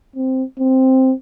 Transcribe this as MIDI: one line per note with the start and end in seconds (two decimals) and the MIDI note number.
0.16 0.43 60
0.59 1.12 60